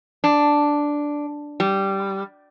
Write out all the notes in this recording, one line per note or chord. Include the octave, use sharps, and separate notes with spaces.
D4
G3